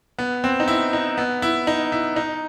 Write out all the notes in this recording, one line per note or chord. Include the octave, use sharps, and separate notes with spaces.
B3
C4
D#4
E4
D#4
B3
E4
D#4
E4
D#4